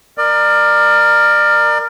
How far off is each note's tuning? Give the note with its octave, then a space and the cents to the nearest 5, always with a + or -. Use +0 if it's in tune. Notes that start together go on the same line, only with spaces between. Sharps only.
A#4 +0 D5 +30